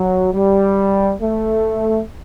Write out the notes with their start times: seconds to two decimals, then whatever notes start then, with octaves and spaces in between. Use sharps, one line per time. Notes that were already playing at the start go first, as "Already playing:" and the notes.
Already playing: F#3
0.34 G3
1.22 A3